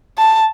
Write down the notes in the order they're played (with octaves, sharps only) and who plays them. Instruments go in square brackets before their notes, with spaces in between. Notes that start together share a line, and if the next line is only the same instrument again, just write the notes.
[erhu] A5